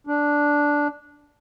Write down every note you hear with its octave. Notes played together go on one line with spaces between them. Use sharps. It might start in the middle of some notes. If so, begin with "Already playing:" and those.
D4